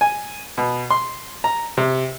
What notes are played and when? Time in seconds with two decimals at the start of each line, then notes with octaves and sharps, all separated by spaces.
0.01 G#5
0.58 B2
0.90 C6
1.44 A#5
1.77 C3